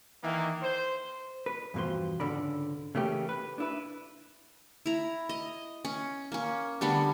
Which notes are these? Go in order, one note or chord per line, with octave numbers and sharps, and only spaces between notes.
D#3 E3 A#3
C5
B4
E2 G2 B2 F3 C6
C#2 G#2 D3 C#4 D5 B5
C#3 E3 A3 A#3 C#4 G4
B4
D4 E4 B4
E4 A#5
D#5
C#4
A#3 C#4
D3 G3 B3 D4